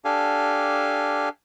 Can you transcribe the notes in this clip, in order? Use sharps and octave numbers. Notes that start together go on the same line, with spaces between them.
D4 G4 A4 F5 G#5